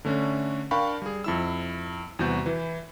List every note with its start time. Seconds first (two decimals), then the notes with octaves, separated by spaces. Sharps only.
0.05 D3 A3 C#4 D4
0.71 D4 A#4 F5 G5 B5 C#6
1.02 G3 G#4
1.24 F2 E4 E6
2.19 E2 C3 G3 F#4 G6
2.46 E3 E4